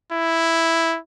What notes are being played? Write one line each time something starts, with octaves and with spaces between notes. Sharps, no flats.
E4